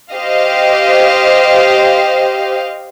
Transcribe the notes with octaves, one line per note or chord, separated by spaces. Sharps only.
G4 C5 D#5 F5